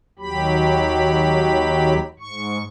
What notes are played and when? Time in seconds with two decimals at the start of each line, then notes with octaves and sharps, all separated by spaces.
0.19 D#2 F#3 G4 B5
2.20 G#2 C#6